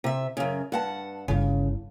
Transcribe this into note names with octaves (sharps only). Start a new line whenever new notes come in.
C3 E5
F#2 C#3
G2 F#5 A5
G1 C#3 E4